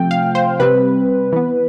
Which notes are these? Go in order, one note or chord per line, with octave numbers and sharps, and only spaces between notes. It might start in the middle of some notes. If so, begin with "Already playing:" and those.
Already playing: C3 F3 A3 C4 G5
F5
C5
C3 G3 C4 B4
E3 B3